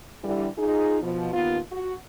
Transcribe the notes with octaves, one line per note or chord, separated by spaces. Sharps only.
D3 E3 G3
D#4 F4 G#4
B2 F3
D#2 B3 F4
F#4